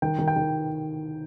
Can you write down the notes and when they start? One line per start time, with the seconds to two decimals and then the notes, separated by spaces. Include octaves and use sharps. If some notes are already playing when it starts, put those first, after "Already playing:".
0.02 D#3 G5
0.19 D#3
0.28 G5
0.36 D#3